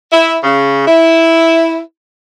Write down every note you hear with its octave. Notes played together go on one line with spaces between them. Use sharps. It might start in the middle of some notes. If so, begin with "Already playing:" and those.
E4
C#3
E4